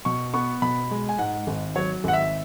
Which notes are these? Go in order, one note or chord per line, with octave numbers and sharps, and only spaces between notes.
B2 C#6
B3 C#6
B2 B5
G#3
G#5
G#2 F#5
G#1
F#3 C#5
G#1 F#5
E5